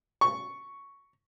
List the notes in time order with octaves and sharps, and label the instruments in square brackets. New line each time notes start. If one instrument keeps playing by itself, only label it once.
[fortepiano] C#6